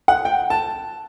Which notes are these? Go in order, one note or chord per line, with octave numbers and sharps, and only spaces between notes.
F#5
G5
A5